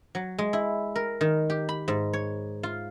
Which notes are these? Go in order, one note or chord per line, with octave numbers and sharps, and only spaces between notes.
F#3
G#3
E4
A#4
D#3
G4
B5
G#2
C#5
F4